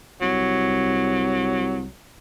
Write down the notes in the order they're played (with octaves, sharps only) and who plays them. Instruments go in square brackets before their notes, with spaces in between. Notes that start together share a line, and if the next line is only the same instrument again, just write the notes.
[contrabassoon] C2 [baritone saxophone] F#3